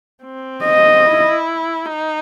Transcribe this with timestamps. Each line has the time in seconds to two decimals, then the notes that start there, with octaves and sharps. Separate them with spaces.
0.25 C4
0.65 D#5
1.05 E4
1.85 D#4